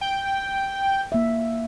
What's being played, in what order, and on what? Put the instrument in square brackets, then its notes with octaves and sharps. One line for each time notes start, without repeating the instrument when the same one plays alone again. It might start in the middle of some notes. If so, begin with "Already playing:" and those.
[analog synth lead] G5
[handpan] A#3 E5